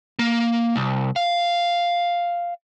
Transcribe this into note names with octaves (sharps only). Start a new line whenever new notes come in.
A#3
C2
F5